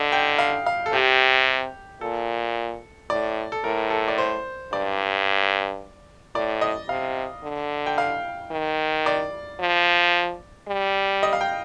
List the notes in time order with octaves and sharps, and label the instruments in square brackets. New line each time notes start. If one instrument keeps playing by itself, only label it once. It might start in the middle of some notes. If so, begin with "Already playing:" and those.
Already playing: [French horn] D3 [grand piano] D#5
[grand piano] G5
F5
F5
A4
[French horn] C3 [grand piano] G4
[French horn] A#2 [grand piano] A4
[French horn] A2 [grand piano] D5
[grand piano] A4
[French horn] A2 [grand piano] A#4
[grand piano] A4
D5
C5
[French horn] G2 [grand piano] D5
[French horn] A2 [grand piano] D5
[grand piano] D#5
[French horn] C3 [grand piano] F5
[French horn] D3
[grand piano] G5
F5
[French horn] D#3
[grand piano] D5
[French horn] F3
G3
[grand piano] D#5
F5
G5